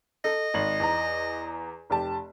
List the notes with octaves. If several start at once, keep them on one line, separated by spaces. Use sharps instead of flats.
A4 D#5
G#1 F#7
E2 A#5
F1 G4 A5